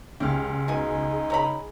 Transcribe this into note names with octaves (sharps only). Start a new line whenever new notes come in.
C#2 G4 G#4 F6
B2 D#4 G#5
C#5 A#5 B5